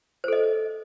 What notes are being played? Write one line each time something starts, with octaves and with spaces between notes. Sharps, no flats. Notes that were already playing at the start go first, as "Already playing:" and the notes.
A4 C5 D#5